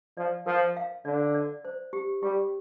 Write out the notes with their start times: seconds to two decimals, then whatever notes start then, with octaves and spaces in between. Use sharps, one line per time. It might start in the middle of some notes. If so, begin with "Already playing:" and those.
0.17 F3 D5
0.46 F3 A#4
0.77 F5
1.05 D3 D5
1.34 D5
1.65 C5
1.93 G4
2.23 G3 G4